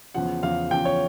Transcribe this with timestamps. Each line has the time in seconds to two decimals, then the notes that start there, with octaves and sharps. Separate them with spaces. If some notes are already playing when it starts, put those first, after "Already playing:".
0.14 E2 C#3 F3 F#5
0.43 E2 C#3 F3 F5
0.71 E2 C#3 F3 G5
0.85 C#5